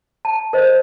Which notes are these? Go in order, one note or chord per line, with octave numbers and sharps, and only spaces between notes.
A5
A#4 C5 D#5